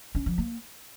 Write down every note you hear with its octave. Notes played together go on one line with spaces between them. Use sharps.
C#4
F3
A#3